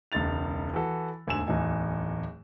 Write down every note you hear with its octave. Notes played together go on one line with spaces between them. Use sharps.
E1 C#2 D#4 A6 F7
E3 F#4 A4
E1 D2 G#2 G#5 E6 E7
D1 E2 D#4 G#5